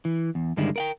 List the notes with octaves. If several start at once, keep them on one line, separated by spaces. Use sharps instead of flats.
E3
E2
G2 D3 D#3 G3 G#3 E4
A#4 F#5 G5